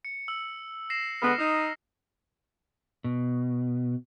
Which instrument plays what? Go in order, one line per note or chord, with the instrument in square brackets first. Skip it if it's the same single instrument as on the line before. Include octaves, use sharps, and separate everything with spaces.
[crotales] C#7
E6 F#7
A#6 C7 E7
[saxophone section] D3 G#3 B3 [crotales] F6 A#6
[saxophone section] D#4
[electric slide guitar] B2